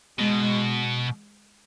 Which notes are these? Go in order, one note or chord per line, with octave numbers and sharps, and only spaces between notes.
B2 G#3